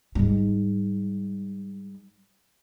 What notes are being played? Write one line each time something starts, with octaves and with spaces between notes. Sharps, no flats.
G#2 G3